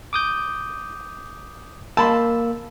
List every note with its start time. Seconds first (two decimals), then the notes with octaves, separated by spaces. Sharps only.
0.13 D6 D#6 G6
1.97 A#3 A5 B5 C6 E6